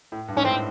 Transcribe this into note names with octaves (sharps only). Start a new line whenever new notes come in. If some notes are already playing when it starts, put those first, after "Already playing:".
A2
G2
G#2 C#4
A2 C4